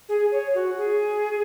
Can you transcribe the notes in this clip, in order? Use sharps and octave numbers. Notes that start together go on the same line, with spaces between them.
G#4
C#5
F#4
G#4